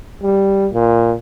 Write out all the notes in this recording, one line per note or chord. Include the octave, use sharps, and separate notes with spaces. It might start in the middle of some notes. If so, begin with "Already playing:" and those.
G3
A#2